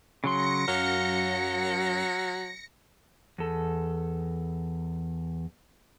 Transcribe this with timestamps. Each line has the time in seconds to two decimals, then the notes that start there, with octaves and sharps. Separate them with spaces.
0.24 C#3 F#3 C6 A#6 C#7
0.68 F#2 F#3 F5
3.38 E2 A4